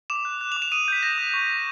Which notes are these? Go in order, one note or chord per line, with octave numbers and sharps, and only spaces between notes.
D6 E7
F#6
F#6
D6 F7
E7
D#6 D#7
G6 B6
G6 A#6
D#6
C#6
F6